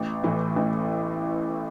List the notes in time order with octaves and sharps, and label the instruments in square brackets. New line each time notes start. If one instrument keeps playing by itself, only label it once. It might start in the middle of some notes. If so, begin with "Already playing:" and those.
Already playing: [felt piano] A1
A2 E3
A1